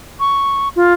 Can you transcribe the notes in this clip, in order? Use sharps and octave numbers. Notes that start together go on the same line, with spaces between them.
C#6
F4